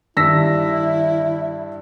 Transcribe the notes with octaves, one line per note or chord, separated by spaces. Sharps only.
G2 D#3 E4 E6 A#6 B6